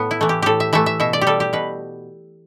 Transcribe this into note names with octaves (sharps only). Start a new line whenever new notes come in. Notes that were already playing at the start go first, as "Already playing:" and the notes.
Already playing: A2 B3
E4
E3 A3
G4
A2 G4 A4
E5
E3 A3 E5
E5
B2 E5
D5
G4
G3 A4
G4
B2 B4